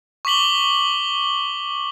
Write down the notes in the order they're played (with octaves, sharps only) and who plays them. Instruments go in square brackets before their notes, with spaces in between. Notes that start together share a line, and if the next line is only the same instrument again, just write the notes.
[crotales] C#6 D6 B6 F#7 G7